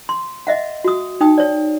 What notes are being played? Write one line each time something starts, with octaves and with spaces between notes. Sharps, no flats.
C6
D#5 E5 F#5
F#4 D#6
D#4 G5 D#6
C#5 D5